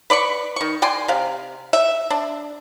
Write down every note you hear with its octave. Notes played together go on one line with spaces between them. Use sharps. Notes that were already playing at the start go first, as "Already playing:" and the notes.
B4 D5 B5 C#6
D#3 C#6
D5 G5 G#5 C6
C3 F5
E5
D4